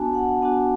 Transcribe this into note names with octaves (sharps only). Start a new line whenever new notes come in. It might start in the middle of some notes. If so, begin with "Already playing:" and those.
Already playing: B3 D4 F#4 G#5 A5
F#5
B3 D4 F#4 G#5